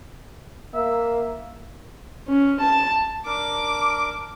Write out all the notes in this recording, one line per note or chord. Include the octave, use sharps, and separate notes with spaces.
A#3 E5
C#4
A5
D4 A#4 D6